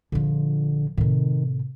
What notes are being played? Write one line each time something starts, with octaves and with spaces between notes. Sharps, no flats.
A#1 D3 F3
A2 C3 D#3